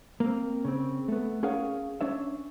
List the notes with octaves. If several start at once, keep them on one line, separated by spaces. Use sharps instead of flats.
A#3 C4
C#3 C4
A3 B3
C#4 G#4 A#4 C#5 F5 F#5
C#4 D4 C#5 E5